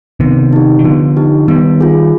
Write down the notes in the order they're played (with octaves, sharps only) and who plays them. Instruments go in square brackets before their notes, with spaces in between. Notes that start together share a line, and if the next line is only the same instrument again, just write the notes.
[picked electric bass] C3 D#3 [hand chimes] B3
[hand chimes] D#4 G4
[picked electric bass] D#3
[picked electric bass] D3 F3 [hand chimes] B3
[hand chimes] D#4 G4
[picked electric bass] D#3 G3 [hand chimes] B3
[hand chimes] F4 G#4